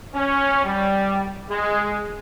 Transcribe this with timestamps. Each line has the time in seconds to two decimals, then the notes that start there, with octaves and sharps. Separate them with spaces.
0.14 C#4
0.64 G3
1.48 G#3